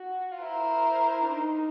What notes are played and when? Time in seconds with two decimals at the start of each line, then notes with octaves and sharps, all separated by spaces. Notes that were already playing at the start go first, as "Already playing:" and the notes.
Already playing: F#4
0.32 F4
0.42 E4 A#4 C5
1.22 D4
1.34 D#4